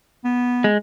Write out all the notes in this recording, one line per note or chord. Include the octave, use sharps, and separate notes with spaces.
B3
G#3